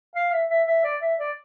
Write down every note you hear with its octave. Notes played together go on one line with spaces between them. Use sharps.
F5
E5
E5
E5
D5
E5
D5